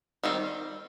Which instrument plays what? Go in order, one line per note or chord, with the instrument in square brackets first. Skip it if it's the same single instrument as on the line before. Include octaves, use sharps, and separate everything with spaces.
[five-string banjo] D#3 G3 C4